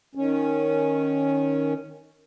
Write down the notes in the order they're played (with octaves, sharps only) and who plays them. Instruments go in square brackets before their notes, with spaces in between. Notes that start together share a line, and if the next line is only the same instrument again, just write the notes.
[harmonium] D#3 C#4